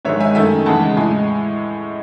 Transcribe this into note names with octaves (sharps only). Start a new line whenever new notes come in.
G#2 D#3 G#3 C#5 E5
E5 G#5
F#2 D#3 A3 E5 G#5
E2 C#3 G#3 F#5 A5
A2 G#3 G#5